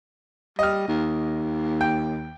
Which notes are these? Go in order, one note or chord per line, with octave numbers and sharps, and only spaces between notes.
G3 D#5 F6
D#2
G5